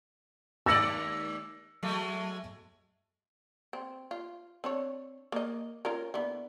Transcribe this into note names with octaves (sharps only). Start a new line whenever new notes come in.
D#2 G#3 D5 E6 A#6 C#7
F#3 G#3 A3
C4
F4
C4 D4 C#5
A#3 D#5
C#4 F4 A#4
D3 E3 B3